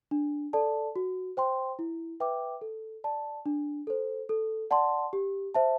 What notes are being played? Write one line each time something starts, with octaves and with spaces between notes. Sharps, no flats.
D4
A4 D5 A5
F#4
C5 G5 C6
E4
B4 E5 G5 D6
A4
D5 A5
D4
A4 C5
A4
D5 F#5 A5 C6
G4
C5 E5 A5